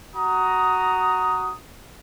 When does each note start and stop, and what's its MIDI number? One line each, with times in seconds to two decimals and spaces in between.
0.15 1.54 66
0.15 1.54 82
0.15 1.54 87